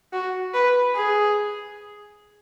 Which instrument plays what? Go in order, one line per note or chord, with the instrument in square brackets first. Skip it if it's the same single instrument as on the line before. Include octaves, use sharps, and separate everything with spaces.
[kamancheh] F#4
B4
G#4